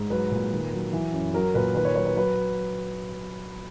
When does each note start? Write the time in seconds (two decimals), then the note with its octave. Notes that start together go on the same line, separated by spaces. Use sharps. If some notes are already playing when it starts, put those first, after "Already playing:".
Already playing: G#2
0.10 F#3 B4
0.31 A#2
0.52 D#3
0.73 F#3
0.93 E3
1.13 F#2
1.34 F#3 A#4
1.54 A#2 B4
1.75 D#3 B4
1.85 C#5
1.95 F#3 C#5
2.05 B4
2.16 F#3 B4